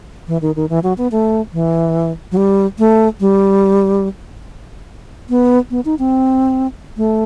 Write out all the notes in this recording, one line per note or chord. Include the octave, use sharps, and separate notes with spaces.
E3
D#3
D#3
E3
F#3
B3
A3
E3
F#3
G3
A3
G3
B3
B3
D#4
C4
A3